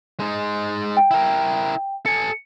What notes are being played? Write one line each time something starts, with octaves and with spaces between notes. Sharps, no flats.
G#3 D#4
G5
E4 A#4
A4 G#5 C#7